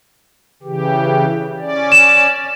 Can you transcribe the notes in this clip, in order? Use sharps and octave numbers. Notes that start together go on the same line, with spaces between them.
C#3 E3 G4
C#4 D5
E7